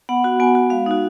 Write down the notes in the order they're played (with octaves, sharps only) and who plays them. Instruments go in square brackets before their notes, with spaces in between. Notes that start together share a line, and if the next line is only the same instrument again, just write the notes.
[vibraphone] B3 F#5
F#4
B3 G#5
F#4
G#3 F5
D#4 F#4